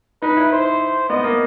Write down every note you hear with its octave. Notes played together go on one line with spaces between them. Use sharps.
D#4 B4
E4
C5
B3 D#5
A#3